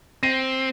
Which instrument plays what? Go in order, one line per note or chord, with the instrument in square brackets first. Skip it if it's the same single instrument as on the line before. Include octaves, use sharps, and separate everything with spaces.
[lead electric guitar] C4 [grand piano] A#6 D#7